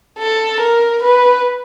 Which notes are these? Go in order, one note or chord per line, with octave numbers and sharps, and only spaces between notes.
A4
A#4
B4